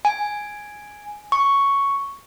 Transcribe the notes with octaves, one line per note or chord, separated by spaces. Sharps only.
G#5
C#6